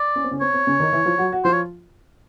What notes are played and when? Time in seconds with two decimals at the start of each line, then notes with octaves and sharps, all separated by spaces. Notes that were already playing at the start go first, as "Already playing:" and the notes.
Already playing: D5
0.16 C#4
0.24 C4
0.31 C#3 C#4
0.41 C4 C#5
0.54 C4
0.67 C#3 C#4
0.80 D#3 D#4
0.92 E3 E4
1.06 F3 F4
1.18 F#3 F#4
1.32 F#4
1.45 F3 F4 C5
1.53 C#5